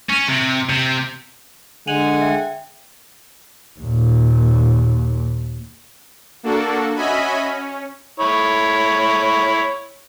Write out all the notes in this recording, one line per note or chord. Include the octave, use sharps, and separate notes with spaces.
C#4
C3
C3
D3 G#3 F#5 G#5 D#7 F7 F#7
E5 G5
D#2 A#2
A#3 D4 F#4 A4
C#4 F#4 D#5 E5 G#5 B5
C#4
E4 C#5